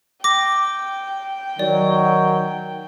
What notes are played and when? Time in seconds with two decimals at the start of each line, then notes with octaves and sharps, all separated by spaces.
0.24 G5 D6 A#6
1.59 D#3 F#3 D5